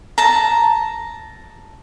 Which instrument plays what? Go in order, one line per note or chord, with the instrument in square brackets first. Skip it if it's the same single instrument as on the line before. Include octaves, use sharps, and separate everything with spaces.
[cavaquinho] A5 A#5